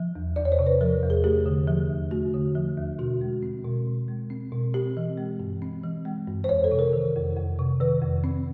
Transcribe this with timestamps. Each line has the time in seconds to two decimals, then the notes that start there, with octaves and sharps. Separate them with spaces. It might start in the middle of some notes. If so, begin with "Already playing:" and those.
Already playing: F3
0.16 E2
0.36 E2 D5
0.45 C#5
0.52 C5
0.59 C3
0.67 B4
0.81 F3 A#4
1.03 E2
1.10 G#4
1.24 A3 G4
1.46 D3
1.68 F3
1.90 D#2
2.11 A3 F#4
2.34 D3
2.55 F3
2.77 D#2
2.99 B2 F#4
3.21 G#3
3.43 C4
3.65 B2
3.87 B2
4.08 G#3
4.30 C4
4.52 B2
4.74 C4 G4
4.97 E3
5.17 G#3
5.40 G2
5.62 C4
5.83 E3
6.05 G#3
6.28 G2
6.44 C5
6.49 F2 C#5
6.64 A4
6.71 C3
6.79 A#4
6.93 D#3
7.16 F2
7.37 F2
7.59 C3
7.80 D#3 B4
8.02 F2
8.24 C4